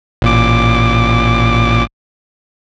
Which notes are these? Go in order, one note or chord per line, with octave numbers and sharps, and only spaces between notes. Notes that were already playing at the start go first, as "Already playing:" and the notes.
A1 A#2 D6